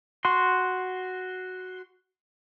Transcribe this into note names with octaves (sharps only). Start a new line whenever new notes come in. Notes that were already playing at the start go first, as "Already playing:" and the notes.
F#4 C6